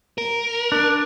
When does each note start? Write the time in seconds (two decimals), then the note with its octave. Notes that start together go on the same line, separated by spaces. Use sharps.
0.18 A#4
0.72 D4